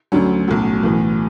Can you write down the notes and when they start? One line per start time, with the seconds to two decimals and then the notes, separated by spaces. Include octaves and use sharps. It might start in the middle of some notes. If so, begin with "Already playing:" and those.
0.12 D2 D3 F#3 C#4
0.48 B1 A2 F#3
0.83 B1 A2 E3